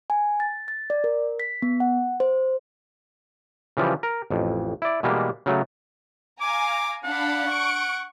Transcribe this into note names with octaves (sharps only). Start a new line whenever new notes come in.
G#5
A6
A6
D5
A#4
B6
B3
F#5
C5
C#3 E3 F3 G3
A#4
A1 F2
E4 D5
B2 E3 G3 G#3 A#3
C#3 F#3 A3
F5 G#5 A#5 D6
D4 F5 F#5 B5
C#6 D7